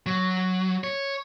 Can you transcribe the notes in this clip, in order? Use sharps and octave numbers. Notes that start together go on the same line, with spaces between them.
F#3
C#5